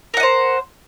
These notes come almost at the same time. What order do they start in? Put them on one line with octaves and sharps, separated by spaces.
A#4 F#5 D#5 C5